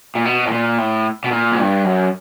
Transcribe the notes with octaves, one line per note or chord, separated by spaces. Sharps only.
A#2
B2
A2
A#2
A2
B2
A#2
G#2
G2
F#2